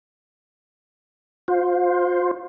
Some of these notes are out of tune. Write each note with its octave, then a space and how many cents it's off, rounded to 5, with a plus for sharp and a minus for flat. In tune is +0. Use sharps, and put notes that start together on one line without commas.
F4 +35 C5 +0